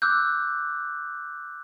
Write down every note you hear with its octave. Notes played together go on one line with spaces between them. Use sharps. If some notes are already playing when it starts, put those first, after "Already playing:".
D6 E6 F#6 G6